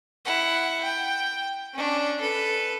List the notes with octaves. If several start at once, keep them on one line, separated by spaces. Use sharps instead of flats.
E4 F#5
G5
C#4 D4
A4 B4